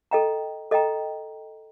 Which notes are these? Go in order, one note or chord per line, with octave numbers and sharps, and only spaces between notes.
A4 D#5 G5 A#5
A4 D#5 G5 A#5